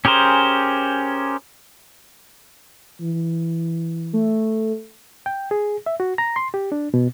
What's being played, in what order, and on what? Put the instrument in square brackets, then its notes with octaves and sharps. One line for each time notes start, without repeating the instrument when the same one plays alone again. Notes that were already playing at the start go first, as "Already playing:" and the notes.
[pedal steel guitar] C#4 G4 G#4 A#4 C5
[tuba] E3
[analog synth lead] A3
[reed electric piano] G5
G#4
E5
F#4
A#5
C6
G4
D4
B2